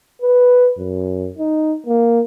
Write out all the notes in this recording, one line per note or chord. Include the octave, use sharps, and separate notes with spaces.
B4
F#2
D#4
A#3